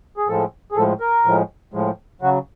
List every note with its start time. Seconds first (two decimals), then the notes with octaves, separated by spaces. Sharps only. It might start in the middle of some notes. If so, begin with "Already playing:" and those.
0.17 G#4
0.28 A2 F3 G#3 A4
0.72 G#4
0.76 A2 F3 G#3 A4
1.00 A#4
1.25 A2 F3 G#3
1.74 A2 F3 G#3
2.22 C#3 F#3 F#4